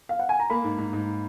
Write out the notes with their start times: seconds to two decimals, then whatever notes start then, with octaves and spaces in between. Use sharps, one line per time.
0.09 F5
0.19 F#5
0.29 G#5
0.40 A#5
0.50 A#3 B5
0.64 G#2
0.78 G#2
0.93 G#2